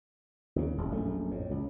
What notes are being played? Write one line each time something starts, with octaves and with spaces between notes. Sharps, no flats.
D#2 C#3
D#1 C2
A#1 F#2 A3
F2 A2
C#2